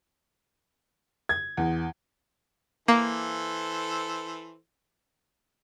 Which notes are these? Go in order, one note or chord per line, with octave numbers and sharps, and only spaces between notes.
G#6
E2
E3 A#3 A4 C5